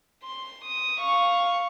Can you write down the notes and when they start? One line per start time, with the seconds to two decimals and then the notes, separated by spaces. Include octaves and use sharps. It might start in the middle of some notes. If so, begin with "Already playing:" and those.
0.23 C6
0.65 D#6
1.00 F5 C#6